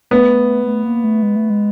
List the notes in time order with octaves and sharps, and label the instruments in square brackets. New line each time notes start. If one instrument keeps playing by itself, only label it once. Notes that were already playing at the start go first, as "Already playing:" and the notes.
[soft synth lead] A3 [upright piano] B3
[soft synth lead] A3
A#3
A3
G#3
A3
G#3